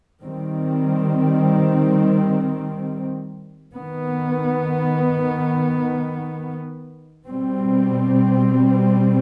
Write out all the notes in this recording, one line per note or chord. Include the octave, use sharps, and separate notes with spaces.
D#3 G3 C4
D#3 B3
B2 G3 C4